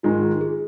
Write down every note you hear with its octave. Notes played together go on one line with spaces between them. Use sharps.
G#2 D#3 G#3 F4
G#4